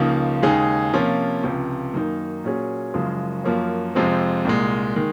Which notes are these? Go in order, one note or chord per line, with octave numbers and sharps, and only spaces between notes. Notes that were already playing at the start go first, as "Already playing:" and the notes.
Already playing: C#2 C#3 F3 A#3 D#4
D#2 C#3 G#3 D#4 G#4
C3 F3 A#3 C#4 F4
C#2 C3 F3
F#2 D#3 A#3 D#4
A#2 F#3 C#4 G#4
F#1 F#2 C#3 F3 G#3
F#2 F3 A#3 C#4
F2 C3 F3 G#3 C4
C2 A#2 G#3
D#3 G#3